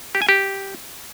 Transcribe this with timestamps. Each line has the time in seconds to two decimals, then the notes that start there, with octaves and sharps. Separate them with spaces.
0.15 G4
0.22 G#5
0.29 G4